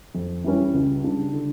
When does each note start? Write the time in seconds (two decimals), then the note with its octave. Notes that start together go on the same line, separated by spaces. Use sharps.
0.15 F2
0.44 E3 G3 C#4
0.74 C#2
1.04 C#3 G3 D4
1.33 D3